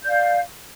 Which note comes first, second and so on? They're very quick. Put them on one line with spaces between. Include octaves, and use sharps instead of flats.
G6 D5 F5